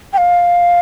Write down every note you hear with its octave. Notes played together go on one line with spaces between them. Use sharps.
G5
F5